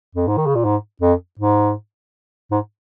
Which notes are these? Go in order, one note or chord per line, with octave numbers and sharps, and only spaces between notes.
F2
G#2
D#3
C#3
A#2
G#2
F2
G#2
G#2